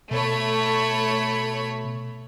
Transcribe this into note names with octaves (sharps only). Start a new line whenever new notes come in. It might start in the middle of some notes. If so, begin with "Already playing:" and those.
B2 A3 C#5 B5